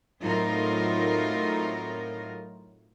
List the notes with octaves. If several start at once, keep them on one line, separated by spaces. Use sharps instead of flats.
A2 F#3 C4 D#4 F4 A#4